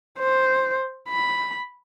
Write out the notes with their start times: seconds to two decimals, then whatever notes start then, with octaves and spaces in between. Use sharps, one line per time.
0.19 C5
1.09 B5